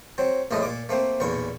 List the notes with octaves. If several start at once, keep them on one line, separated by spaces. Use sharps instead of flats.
F#3 C4
A#1 F#2 A2 A3 D#5
A#2 D6
A3 A#3 C4
B1 E2 A#2 C#6